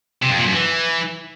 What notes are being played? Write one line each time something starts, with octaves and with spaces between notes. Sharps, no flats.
C3
F2
A#2
F#2
E3